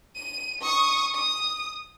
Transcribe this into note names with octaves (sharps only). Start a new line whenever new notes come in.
D#7
C#6 D#6
D#6